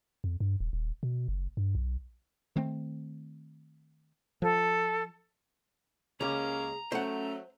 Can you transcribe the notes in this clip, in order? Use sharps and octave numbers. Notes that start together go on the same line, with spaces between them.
F2
G2
D#1
D#1
B2
F#1
G2
B1
D#3 A3 C4
F3 A4
C#2 A#3 C#4 G4 G#4 A#5
F#3 A3 C#4 C5 F#5